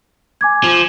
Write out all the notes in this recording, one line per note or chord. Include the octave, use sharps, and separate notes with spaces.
G#5 D6 G#6
F3